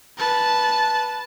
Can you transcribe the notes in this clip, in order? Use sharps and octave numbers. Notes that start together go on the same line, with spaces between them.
B4 A5